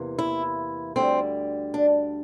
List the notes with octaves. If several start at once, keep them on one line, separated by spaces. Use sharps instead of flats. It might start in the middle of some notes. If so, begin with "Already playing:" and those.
Already playing: E2 C3 E3 A#3
E4
D2 D3 G3 C4
D4